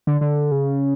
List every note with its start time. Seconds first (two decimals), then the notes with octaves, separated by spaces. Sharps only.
0.07 D3
0.21 D3
0.51 C#3